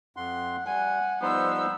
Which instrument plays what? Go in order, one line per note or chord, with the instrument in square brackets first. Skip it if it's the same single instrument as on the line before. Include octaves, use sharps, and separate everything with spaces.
[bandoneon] F2 C6 [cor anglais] F#5
[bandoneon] G3 [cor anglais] F#5 [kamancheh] G#5
[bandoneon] F3 G3 D#4 [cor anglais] B3 [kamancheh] C5 E6